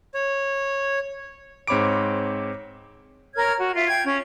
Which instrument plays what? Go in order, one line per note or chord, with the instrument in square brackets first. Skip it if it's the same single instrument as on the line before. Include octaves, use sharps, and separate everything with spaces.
[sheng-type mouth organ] C#5
[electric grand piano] G#2 C4 C#5 B5 D6 D7
[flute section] A#4 C#5 F6 G#6
F#4
F4 E5
G5 G#6
C#4